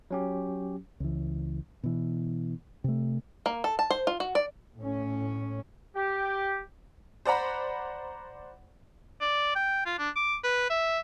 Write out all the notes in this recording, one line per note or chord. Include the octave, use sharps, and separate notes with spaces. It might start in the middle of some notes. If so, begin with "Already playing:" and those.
F#3 C#4 G4
C#2 E3
B2 E3
C3 A3
A#3
A4
A5
C5
F4
F#4
D5
A2 C#4
G4
C5 D5 F#5 A#5 B5
D5
G5
F4
D4
D6
B4
E5